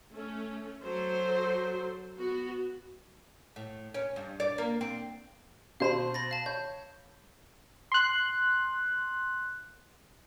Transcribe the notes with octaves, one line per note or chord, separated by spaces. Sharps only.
A3 C#4
F#3 A4 C5
B3 F#4
A2
C#4
G2
D5
A#3
C4
B2 C5 F5 A5 B5
B5 A6 A#6
F5 A5
C#5 G6
C6 F#6